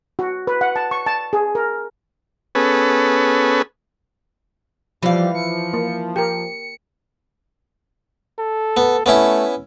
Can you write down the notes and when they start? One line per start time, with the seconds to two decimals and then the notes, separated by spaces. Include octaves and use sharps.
0.19 F#4
0.47 B4
0.61 F#5
0.76 A5
0.91 C#6
1.06 A5
1.33 G#4
1.55 A#4
2.55 B3 C#4 G#4 A4 B4
5.03 E3 F3 G3 F5
5.35 F3 C#7
5.73 A#3
6.16 G4 A#4 C#7
8.39 A4
8.77 B3
9.06 A3 B3 C#4 E4